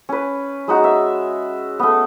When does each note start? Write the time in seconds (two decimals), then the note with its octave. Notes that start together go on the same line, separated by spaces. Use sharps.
0.09 C#4 B4
0.68 G#3 D#4 F#4
0.84 E5
1.79 A3 B3